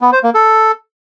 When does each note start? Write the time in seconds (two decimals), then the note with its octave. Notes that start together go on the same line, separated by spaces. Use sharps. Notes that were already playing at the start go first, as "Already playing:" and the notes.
0.01 B3
0.12 C5
0.23 A#3
0.34 A4